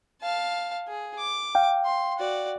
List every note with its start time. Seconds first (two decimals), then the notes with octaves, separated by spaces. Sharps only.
0.22 F5 A5
0.88 G#4
1.18 D6
1.55 F5 G5
1.85 C6
2.18 F#4 D5